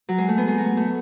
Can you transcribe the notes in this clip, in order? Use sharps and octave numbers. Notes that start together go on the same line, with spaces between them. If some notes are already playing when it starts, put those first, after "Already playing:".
F#3
G#3
A3
B3
G#3
F#3
A3